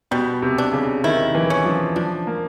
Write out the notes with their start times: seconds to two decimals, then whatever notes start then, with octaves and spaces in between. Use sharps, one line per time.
0.11 B2 G3
0.42 C3
0.58 D4
0.73 C#3
1.04 D#3 E4
1.35 E3
1.50 C#4
1.65 F3
1.96 F3 D4
2.27 A#3